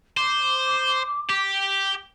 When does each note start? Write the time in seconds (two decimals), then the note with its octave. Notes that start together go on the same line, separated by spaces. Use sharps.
0.17 C5 D6
1.30 G4